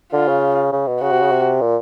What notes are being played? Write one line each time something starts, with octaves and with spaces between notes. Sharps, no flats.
D3 F4
C#3
C#3
B2
C#3 F#4
C3
C#3
C3
A#2